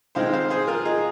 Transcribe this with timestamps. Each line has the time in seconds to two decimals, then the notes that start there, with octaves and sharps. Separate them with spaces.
0.15 D#3 G#3 C4 C5 F5
0.33 C5 F5
0.50 G#4 C5
0.67 F4 A#4
0.85 D#4 G#4